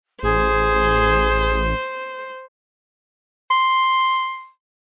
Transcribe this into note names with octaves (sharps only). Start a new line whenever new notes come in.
A1 G#4 C5
C6